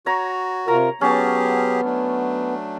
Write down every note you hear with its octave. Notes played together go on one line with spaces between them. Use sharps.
F#4 C#5 A#5
C3 F4 A#4 A#5
F#3 B3 C#4 G4 G#4 A5
F#3 A3 D4